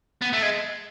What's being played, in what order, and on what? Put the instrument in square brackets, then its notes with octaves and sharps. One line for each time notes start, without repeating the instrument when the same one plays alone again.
[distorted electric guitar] B3
A3
G#3